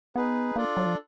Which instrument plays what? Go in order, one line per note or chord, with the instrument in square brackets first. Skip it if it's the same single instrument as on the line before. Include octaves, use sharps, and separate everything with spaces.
[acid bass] B3 [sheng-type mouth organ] D#4 G#4 B4
[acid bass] A#3 [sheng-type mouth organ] D4 F4 A4 D5
[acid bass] F#3
F3